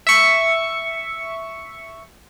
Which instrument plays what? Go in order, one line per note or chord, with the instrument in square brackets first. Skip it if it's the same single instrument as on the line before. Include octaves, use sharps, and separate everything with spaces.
[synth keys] E5 C#6